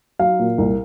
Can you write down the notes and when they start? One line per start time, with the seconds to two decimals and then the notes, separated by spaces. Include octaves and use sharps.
0.19 F#3 F5
0.39 A#2
0.58 C2